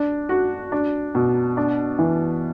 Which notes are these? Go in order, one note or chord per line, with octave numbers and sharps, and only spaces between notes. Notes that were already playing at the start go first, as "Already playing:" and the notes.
Already playing: D4
F#4
D4
B2
D4
E3